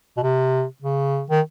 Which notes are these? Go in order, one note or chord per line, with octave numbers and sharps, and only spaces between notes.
B2
C3
C#3
D#3